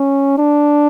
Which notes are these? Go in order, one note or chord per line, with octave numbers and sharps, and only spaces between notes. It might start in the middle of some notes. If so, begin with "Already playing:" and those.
Already playing: C#4
D4